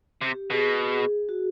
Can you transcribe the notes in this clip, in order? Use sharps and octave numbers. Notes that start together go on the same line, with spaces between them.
C3 G4
B2 G#4
F#4